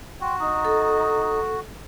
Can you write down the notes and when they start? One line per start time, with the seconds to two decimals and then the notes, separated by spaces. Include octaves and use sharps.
0.21 F#4 G5 C6
0.38 D#4 A#5 D#6
0.65 A4